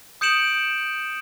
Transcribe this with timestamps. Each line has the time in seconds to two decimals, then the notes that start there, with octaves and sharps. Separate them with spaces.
0.21 D#6 G6 C#7 D7 E7 F#7